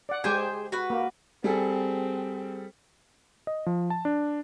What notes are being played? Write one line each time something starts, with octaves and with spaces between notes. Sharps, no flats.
D5 F#5
G#3 G4 G#4 C5 G5 G#5
F#4 B4
A#3 A#4
G3 C4 G#4 A4
D#5
F3
A5
D4